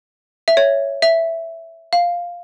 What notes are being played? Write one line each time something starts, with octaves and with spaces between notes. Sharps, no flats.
E5
C#5
E5
F5